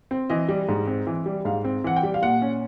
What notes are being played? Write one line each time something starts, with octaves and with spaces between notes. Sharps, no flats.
C4
E3 D#5
G3
G#2
C4
E3
G3
G#2 F5
C4
E3 F#5
G5
G3
F5
A#2 F#5
C#4